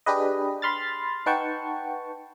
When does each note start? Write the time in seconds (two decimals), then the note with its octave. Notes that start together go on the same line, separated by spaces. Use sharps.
0.06 D4 G4 G#4 B4 D#5
0.62 B5 C6 F6 A6
1.26 D#4 B4 F#5 G5 A5 C#6